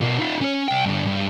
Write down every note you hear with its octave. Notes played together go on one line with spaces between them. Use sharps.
B2 F4
D#4 F4
C#4 C#5
C2 G5
G2 D3
G2